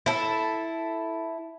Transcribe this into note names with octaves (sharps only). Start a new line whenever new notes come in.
E4 A4